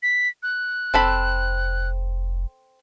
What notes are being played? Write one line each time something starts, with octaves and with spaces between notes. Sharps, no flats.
B6
F#6
F1 C4 A4 B5